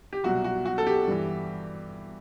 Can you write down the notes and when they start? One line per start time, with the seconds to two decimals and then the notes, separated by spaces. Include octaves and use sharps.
0.13 G4
0.24 C2 B2 F#3 F#4
0.44 F#4
0.66 F#4
0.78 A4
0.87 G4
1.07 G2 E3